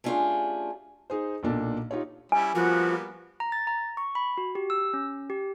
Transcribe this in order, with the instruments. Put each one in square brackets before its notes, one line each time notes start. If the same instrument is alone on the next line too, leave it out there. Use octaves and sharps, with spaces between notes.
[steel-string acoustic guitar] A3 C#4 D4 F4 G4 G#4
[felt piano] D#4 G#4 C5
B1 A#2 D4 A4
D#4 F4 G4 C#5
[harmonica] G3 C#4 E4 [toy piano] G#5
[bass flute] F3 [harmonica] G3 A#3 B3 [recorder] F#4
[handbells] A#5
A6
A#5
C#6
B5
F#4
G4
E6
C#4
G4